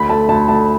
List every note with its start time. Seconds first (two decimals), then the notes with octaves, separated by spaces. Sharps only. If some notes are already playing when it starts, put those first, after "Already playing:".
Already playing: D2 B5
0.09 A3 A5
0.29 D2 A5
0.48 D2 A5